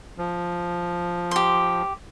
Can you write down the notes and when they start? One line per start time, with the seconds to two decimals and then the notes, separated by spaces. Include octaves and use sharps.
0.18 F3
1.31 G4 C6